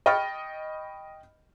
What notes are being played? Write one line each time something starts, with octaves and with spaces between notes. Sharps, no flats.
D#5 G5 B5 C#6 F6 A6